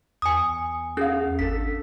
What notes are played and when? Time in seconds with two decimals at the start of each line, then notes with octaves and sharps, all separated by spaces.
0.22 E2 G#5 D#6
0.97 C#4 G#4 F5
1.39 G#1 D4 A4 B6